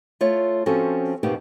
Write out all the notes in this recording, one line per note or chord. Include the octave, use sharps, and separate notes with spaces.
A3 F4 C#5
F3 C4 C#4 F#4 A4
F2 B2 A#3 B3 D#4 G4